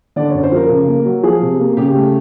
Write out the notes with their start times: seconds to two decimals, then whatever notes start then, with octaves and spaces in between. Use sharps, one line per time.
0.16 D3 D5
0.30 F#2 C#5
0.43 C5
0.52 F3 A#4
0.70 C#3
0.88 A#3
1.06 F#3
1.23 F3 G#4
1.41 C3
1.59 A#3
1.77 C#3 G4
1.95 A3